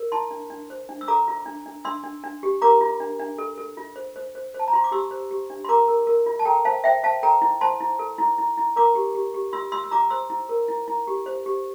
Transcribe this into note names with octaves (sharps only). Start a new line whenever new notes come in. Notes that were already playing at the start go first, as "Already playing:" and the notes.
Already playing: A#4
E4 A5 C6
D4
D4
C5
D4
E6
A4 A#5 D6
F4
D4
D4
D4 C6 E6
D4
D4
G4
A#4 A#5 D6
F4
D4
D4
A4
A4
F4
C5
C5
C5
C5
A5
A#5
F4 C6
D6
G4 C6 E6
C5
G4
D4
C6
A#4 A#5 D6
A#4
A#4
F4
A5
A4 G5 A#5
C5 F5 A5
C5 E5 G5
C5 F5 A5
A4 G5 A#5
E4
C5 A5 C6
E4
A4
E4
E4
E4
A#4 A#5 D6
G4
G4
G4
F4 C6 E6
F4 C6 E6
E6
F4 A#5 D6
C5 C6 E6
E4
A#4
E4
E4
G4
C5
G4